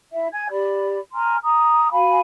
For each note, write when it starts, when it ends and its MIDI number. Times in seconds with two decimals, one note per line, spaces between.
0.13 0.27 64
0.13 0.27 76
0.32 0.46 80
0.32 0.46 92
0.51 0.98 67
0.51 0.98 74
0.51 0.98 83
1.13 1.35 80
1.13 1.35 82
1.13 1.35 84
1.13 1.35 89
1.43 1.88 82
1.43 1.88 87
1.92 2.20 66
1.92 2.20 77
1.92 2.20 80
1.92 2.20 83